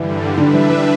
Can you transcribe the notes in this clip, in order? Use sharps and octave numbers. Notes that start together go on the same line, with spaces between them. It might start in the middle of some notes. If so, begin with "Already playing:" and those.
Already playing: G2 D3 E3 G3
D3 G3 D4 B4 E5
E3
E3